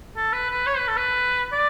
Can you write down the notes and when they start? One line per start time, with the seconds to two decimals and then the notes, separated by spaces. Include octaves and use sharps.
0.16 A4
0.33 B4
0.50 B4
0.66 C#5
0.78 B4
0.88 A4
0.97 B4
1.52 D5